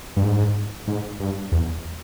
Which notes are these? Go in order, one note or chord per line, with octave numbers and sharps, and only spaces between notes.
G2
G#2
G#2
G2
E2